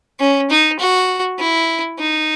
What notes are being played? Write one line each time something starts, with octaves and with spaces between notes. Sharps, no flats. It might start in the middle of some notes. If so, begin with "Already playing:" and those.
C#4
D#4
F#4
E4
D#4